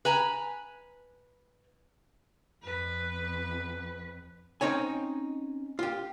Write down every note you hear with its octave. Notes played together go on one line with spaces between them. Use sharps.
B4 G#5 A#5
F2 B4
C4 C#4 D#4 C#5 G#5
F4 G4